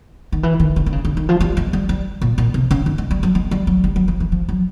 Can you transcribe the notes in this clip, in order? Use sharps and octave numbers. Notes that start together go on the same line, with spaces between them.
D#3
E3
D#3
D3
D3
C#3
D3
D#3
F3
G3
G#3
G3
G3
A#2
A#2
C3
C#3
D#3
G#3
G3
F#3
G#3
G3
F#3
G3
F#3
F3
E3
F3
F#3